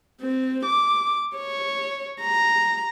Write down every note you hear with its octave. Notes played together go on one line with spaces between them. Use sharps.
C4
D6
C#5
A#5